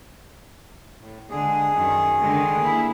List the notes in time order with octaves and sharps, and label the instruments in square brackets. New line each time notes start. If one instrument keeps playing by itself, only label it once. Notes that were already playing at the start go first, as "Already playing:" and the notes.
[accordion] A2
[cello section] D3 G#3 [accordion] G#4
[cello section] F#2 D#3
D3 D#3 G#3
A#3 E4